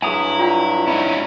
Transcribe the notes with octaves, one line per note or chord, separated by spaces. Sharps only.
G2 F#3 E4 G#4 F#5 G#5 A#5 D#6
F4 D5 G5
C#4 D#4 E4 D#5